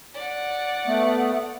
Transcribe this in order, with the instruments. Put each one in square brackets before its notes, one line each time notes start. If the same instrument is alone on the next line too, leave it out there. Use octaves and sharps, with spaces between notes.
[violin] D5 F#5
[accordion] A3 B3